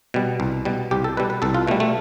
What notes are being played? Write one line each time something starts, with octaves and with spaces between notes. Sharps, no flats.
B2 G3
C2
B2 G3
C2 G4
A4
B2 G3 B4
B4
C2 A4
F4
B2 G3 A3
A3